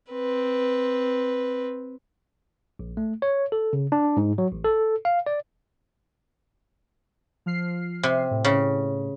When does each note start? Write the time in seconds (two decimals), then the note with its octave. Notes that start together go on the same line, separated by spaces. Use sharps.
0.11 C4 B4
2.79 A#1
2.97 A3
3.22 C#5
3.52 A4
3.73 C#3
3.92 D4
4.17 G#2
4.38 F#3
4.52 A1
4.65 A4
5.05 F5
5.26 D5
7.46 F3 F6 C7
8.03 C3
8.31 A2
8.45 C#3